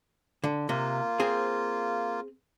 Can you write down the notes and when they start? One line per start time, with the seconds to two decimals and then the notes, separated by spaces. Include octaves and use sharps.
0.44 D3
0.69 C3 A#3 F4
1.20 C4 G#4 C5